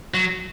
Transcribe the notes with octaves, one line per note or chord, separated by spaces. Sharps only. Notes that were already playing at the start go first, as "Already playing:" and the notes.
F#3